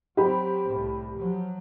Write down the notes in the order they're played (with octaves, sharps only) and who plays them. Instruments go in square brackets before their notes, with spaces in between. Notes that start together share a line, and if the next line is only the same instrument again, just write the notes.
[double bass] F#3 C4 [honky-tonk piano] G4 B5
[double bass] C2 A2
F3 F#3